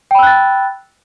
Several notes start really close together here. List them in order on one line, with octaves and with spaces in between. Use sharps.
G5 B5 E6 F#6 A6